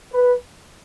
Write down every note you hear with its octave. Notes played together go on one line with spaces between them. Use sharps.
B4